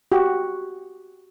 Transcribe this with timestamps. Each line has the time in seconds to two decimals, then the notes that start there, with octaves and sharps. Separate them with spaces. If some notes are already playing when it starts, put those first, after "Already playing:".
0.12 F#4 G4